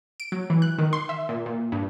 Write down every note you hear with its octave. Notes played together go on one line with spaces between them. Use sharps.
D7
F#3
E3
F#6
D#3
C6
E5
A#2
A#2
G2